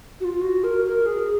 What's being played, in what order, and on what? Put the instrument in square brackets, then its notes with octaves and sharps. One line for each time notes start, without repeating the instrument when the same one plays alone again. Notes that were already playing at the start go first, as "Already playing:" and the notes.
[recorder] F#4
F4
F#4
A#4
A#4
G#4